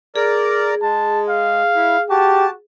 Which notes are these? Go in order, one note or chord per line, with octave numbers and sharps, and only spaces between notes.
G#4 A#4 D5
G#3 A5
F5
E4
F#4 G4 A5